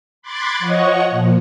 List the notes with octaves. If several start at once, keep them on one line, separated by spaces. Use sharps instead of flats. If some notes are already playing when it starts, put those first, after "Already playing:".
B5 C6 D6 F#6 G#6 A6
F3 C#5 D#5 F#5 C#6
A#2 F3